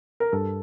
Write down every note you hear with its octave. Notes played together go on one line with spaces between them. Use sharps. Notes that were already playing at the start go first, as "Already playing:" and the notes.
A#4
G2 A4